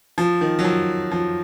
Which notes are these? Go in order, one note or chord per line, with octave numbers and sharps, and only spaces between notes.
F3
D#3
F#3
F3
F3